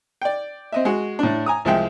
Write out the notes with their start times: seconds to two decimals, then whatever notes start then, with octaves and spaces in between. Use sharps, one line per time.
0.22 D5 G5
0.72 C4 D#5 E5
0.85 G#3 F#4
1.19 A2 D4
1.46 G#5 A#5 D#6
1.65 C2 F3 G#3 E5 G5